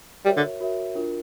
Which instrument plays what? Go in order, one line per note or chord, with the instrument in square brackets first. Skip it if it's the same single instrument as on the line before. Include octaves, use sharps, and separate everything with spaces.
[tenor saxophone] G3 [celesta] F#4 A#4 C#5 E5
[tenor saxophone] D3
[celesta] F#4 A#4 C#5 E5
D4 F4 A#4